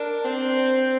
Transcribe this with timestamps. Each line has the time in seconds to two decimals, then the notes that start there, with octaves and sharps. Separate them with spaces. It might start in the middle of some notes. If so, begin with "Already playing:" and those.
Already playing: D4 A#4
0.25 C4 C5